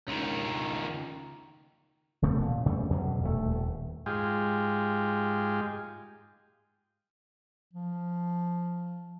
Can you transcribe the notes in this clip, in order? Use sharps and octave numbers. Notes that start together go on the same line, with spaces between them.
C#2 D#3
D1 C3 A3 B3
A#2
E2 C#3 G3 A3
E2 G2 B2 F#3
D#1 D2 G#2 A3
D#1
G#2 G#3 F4 G4
F3